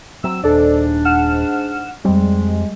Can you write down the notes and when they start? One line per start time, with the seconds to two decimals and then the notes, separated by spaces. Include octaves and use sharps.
0.24 F#3 C4 E6
0.44 D#1 G#2 D4 A4 D5
1.05 F#5 F6 E7
2.05 F2 G3 G#3 C4